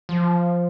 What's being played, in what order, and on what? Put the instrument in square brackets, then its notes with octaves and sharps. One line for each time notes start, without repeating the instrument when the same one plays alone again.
[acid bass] F3